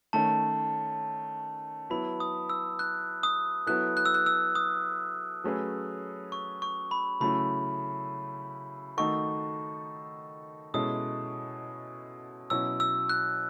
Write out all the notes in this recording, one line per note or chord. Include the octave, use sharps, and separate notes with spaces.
D#3 A3 C#4 A5
F#3 B3 E4 B5
D#6
E6
F#6
D#6
F#3 B3 E4 A4 F#6
F#6
E6
F#6
E6
D#6
F#3 A3 C#4 G#4 B4
C#6
C#6
B5
C#3 F#3 A3 C#4 E4 B5
D#3 A3 D#4 F#4 A4 C#6
B2 G#3 C#4 E4 A4 D#6
B2 F#3 C#4 E4 E6
E6
F#6